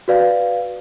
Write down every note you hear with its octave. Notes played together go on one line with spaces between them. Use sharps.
F#4 B4 D5 F5